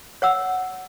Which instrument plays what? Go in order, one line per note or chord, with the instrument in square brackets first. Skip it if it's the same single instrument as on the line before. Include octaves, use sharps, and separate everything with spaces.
[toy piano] C#5 F#5 E6